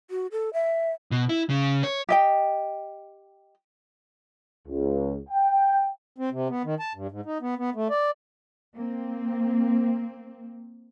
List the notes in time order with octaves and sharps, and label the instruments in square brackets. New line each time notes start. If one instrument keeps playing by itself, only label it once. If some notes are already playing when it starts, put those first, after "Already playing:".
[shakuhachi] F#4
A4
E5
[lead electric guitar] B2
E4
C#3
C#5
[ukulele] G4 D#5 G5
[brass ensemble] C#2
G5
[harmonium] C4
C3
B3
D#3
A5
G2
G#2
D#4
B3
B3
A3
D5
[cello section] A#3 C4